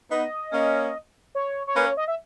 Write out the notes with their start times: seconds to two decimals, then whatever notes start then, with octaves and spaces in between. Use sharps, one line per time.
0.10 B3 D#4 D#5
0.52 A#3 C#4
1.35 C#5
1.67 C#5
1.76 A#3 C#4 B4
1.86 C#5
1.97 D#5
2.08 E5